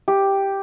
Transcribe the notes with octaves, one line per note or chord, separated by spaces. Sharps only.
G4